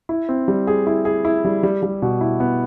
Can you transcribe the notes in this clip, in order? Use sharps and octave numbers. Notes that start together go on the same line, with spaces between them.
E4
C4
G3
G#4
E4
G#4
E4
G3
G3
G3
B2
E4
B3